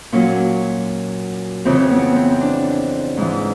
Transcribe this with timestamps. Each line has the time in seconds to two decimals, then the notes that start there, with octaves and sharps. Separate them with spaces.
0.12 A#2 F#3 C#4
1.65 F2 C#3 E3 C4
1.91 B3
2.16 C4
2.41 D4
3.17 G#2 E3